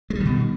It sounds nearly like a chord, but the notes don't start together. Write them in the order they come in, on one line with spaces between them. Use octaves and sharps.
G#3 G3 D#3 B2